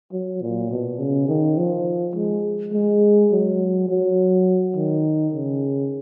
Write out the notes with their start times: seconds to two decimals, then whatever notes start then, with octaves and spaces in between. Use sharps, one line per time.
0.12 F#3
0.42 A#2
0.71 B2
0.99 C#3
1.28 D#3
1.57 F3
2.16 G#3
2.73 G#3
3.31 F#3
3.89 F#3
4.76 D#3
5.34 C#3